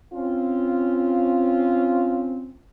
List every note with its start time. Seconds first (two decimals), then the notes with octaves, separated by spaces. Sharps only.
0.13 C4 C#4 F4